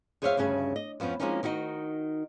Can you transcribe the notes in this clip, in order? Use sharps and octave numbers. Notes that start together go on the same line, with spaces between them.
F2 G#4 C5 C#5 E5 F5
D2 G2 C#3 C#4 G#4
D#5
F2 F3 B3 C#4
F3 G#3 A#3 C4 C#4 D#4
D#3 D#4 F#4 A4 D#5